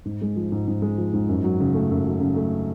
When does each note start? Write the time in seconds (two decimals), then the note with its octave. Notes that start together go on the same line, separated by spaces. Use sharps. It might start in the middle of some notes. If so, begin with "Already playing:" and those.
0.05 G#2
0.21 G#3
0.36 F3
0.52 G#2
0.67 G#2
0.82 G#3
0.98 F3
1.13 G#2
1.28 F#2
1.44 F#3
1.60 C#3
1.74 A3
1.90 F#2
2.05 F#3
2.20 C#3
2.36 A3